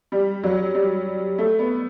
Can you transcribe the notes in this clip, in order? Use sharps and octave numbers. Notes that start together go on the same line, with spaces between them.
G3
F#3
G3
A3
B3